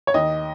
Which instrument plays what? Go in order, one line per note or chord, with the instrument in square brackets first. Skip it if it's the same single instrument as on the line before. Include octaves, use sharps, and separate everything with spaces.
[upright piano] C#5
D#2 D#5